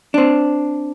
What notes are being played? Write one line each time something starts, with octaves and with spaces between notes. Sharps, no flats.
C4 D4